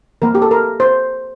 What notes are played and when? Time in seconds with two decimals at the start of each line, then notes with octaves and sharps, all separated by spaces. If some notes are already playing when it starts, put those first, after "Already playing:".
0.22 F3 A#3 A#4
0.35 G4
0.42 A4
0.51 A#4
0.80 C5